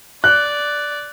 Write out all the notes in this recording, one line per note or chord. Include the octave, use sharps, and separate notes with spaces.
D5 F#6